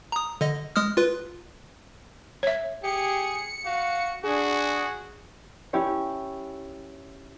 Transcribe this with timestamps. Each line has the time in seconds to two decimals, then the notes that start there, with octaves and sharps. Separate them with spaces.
0.12 A#5 D#6
0.41 D3 D#5
0.76 G#3 D#6 F6
0.97 F4 B4
2.43 C#5 E5
2.83 G4 G#4 C#7
3.65 F#4 F5
4.24 D4 F#4 G#4
5.73 C#4 E4 G4 C#5